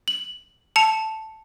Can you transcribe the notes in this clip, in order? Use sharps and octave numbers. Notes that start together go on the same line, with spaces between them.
F#7
A5 C#7 F7